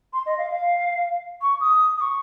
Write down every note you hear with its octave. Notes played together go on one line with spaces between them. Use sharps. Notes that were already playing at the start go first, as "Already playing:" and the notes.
C6
D#5
F5
F5
C#6
D#6
D#6
C#6